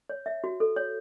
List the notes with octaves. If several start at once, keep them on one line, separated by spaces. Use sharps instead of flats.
C#5
E5
F#4
A4
C#5